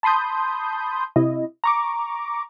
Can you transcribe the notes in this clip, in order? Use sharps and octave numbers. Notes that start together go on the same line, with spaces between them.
A5 B5 C6 D#6 G6
C3 E4 D#5
A#5 C#6 D6